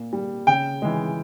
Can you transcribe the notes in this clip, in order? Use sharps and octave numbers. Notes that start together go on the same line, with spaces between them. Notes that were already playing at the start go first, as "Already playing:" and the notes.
Already playing: A#2
G3
C#3 G5
E3 G#3